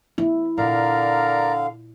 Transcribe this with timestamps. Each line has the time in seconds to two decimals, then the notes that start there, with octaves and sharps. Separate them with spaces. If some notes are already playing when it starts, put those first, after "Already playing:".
0.18 B3 E4
0.58 A#2 D3 A#4 D5 F5 A#5